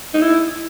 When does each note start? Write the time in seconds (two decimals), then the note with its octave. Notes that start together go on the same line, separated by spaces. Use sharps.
0.14 D#4
0.22 E4